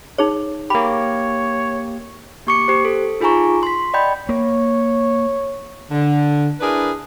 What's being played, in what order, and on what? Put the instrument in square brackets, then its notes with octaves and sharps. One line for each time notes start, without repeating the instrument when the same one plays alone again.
[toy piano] D#4 G#4 C#5
[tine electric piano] A#3 G4 [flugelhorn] C#5 [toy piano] B5
[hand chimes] A#3 G4 C#6 D6 C#7
G4 C5
A4
D#4 F4 G#4 G#5 A#5 C#6
C6 B6
D5 D#5 F#5 G5 B5 G6
[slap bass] A#3 [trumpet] C#5
[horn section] D3
D4 E4 G#4 A#4 B4